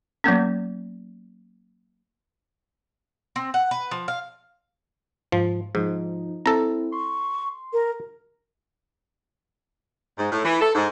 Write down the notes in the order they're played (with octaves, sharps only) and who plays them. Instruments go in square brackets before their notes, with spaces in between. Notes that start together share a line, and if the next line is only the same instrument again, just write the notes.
[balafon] F#3 A#3 B3 C#4
[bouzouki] C4
F#5
B4
F3
F5
[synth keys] G#2 [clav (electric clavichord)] F3
[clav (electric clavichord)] G#2 [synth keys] F3 D#4
[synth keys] C4 E4 [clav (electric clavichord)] A4 A#5
[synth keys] C6 [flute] C#6
[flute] A#4
[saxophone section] G#2
A2
E3
A4
G#2